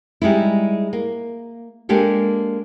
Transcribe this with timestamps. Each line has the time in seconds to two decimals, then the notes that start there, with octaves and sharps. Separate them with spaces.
0.22 G3 G#3 D#4 E4
0.93 A#3
1.89 G#3 A#3 D4 G4 A4